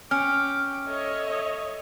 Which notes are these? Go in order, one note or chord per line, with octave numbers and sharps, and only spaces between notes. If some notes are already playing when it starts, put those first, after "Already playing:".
C#4 G5 D6 F6
A4 C#5 D#5 E5